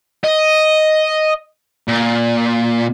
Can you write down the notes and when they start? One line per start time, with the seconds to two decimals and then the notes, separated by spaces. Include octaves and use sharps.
0.24 D#5
1.88 A#2